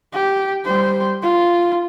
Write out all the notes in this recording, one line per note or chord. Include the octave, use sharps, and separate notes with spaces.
G4
G3 C5
F4